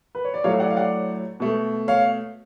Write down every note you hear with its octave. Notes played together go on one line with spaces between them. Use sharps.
B4
C#5
D5
A2 F#3 A3 C#5 F5
D5 F#5
F5
D5 F#5
B2 A3
C#5 F5